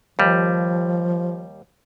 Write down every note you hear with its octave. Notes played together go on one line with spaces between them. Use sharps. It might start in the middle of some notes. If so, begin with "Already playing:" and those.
D#2 F3 G3